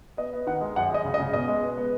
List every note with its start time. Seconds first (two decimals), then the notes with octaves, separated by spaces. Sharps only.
0.17 B3 D#5
0.33 B3
0.47 D#3 F#5
0.61 G#3
0.76 F#2 F#5
0.90 G#3 D#5
1.05 C#3
1.14 D#5
1.20 C#3
1.33 B2 D#5
1.48 G#3
1.63 B3
1.77 B3